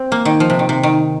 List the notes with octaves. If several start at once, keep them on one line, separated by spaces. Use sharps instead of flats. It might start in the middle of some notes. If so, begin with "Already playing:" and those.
Already playing: C4
A#3
D#3
F3
C3
D#3
C3
D#3